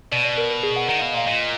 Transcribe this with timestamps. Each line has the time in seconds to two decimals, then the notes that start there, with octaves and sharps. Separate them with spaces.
0.12 B2 D5
0.25 D5
0.38 A#4
0.51 A#4
0.63 G#4
0.76 F#5
0.89 D#3 F#5
0.99 F5
1.02 B2
1.09 D#5
1.14 A#2 F5
1.27 A#2 D#5